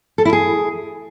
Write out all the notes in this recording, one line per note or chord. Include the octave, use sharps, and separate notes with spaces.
A4
E4
G#4